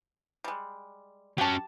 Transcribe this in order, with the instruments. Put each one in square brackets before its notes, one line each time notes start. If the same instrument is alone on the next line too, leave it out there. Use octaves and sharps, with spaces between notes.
[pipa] G3 G#3
[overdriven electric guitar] F#3 C#4 [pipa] G4 A5